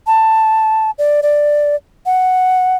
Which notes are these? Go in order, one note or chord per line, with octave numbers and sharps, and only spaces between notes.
A5
D5
D5
F#5